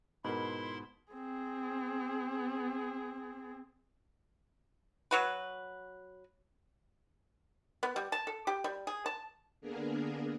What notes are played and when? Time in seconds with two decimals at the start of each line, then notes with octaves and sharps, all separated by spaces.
0.24 G#2 B2 E4 A#4 B5 C6
1.12 C4 G#4
5.11 F#3 F#4 B4
7.83 B3
7.96 G3
8.12 A5
8.27 A4
8.47 G4
8.64 G3
8.87 G#4
9.06 A5
9.61 D3 A#3 B3 D4 G#4 A#4